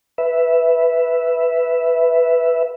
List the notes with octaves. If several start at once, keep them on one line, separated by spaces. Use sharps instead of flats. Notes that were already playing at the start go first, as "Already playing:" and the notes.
B4 E5